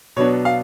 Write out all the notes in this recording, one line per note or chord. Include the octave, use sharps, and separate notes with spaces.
B2 F#3 B3 D4 C#5
F5